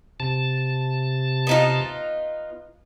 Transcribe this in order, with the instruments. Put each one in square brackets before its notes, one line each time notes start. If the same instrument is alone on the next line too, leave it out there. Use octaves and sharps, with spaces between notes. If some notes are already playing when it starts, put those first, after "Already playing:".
[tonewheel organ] C3 A5
[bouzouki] B3 D#4 F4